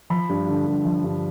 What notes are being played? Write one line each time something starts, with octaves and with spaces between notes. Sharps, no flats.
F3 B5
G2
D3
G2
F3
G2